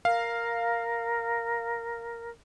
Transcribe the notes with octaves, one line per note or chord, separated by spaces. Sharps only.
A#4 F5